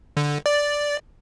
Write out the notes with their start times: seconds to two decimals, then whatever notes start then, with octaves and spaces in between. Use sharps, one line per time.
0.17 D3
0.46 D5